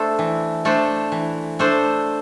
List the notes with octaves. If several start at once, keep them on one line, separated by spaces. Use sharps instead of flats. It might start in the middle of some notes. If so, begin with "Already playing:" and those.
Already playing: A3 D4 A4 C5
E3
A3 D4 A4 C5
E3
A3 D4 A4 C5